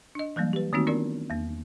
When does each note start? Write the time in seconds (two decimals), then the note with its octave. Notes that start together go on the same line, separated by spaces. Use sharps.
0.15 D4 D#5
0.36 E3 F#3 G3 A#3
0.53 G4 B4
0.73 D#3 A3 A#3 C4 D#4 F#4
0.87 B3 D4 F4 A#4 D5
1.30 E2 A#3